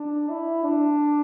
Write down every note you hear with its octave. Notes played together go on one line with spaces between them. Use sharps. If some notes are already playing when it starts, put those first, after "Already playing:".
Already playing: D4
E4
D4